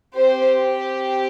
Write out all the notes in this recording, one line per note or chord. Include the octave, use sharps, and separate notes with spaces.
C4 G4 C5